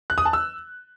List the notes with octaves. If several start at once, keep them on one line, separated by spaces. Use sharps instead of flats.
F#6
D#6
A5
E6